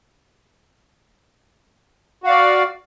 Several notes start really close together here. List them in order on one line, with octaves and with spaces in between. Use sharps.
F#4 F5 D5